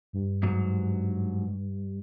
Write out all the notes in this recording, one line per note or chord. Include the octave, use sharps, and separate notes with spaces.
G2
G#2 F#3